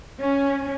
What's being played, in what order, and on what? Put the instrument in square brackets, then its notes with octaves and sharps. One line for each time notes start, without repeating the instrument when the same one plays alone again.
[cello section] C#4